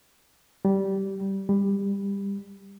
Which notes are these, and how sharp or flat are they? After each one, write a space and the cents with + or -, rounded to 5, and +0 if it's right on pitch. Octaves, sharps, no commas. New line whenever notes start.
G3 -15
G3 +20